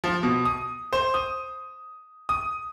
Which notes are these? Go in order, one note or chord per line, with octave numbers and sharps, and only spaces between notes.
F3
B2
D#6
C5
D#6
D#6